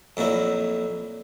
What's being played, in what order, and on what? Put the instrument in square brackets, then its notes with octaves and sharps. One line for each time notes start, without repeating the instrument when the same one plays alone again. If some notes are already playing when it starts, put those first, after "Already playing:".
[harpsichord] F2 A#2 F#3 E4